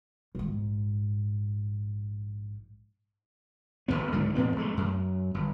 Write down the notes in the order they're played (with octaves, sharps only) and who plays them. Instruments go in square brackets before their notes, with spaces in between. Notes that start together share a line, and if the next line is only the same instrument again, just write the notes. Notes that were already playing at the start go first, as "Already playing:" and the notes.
[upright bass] A#1 G#2
[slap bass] F1 D2 G2 B3
C#2 G#2 D3 F#3
E2 A2 B3 C4
A#1 G#3 A3
F#2
G1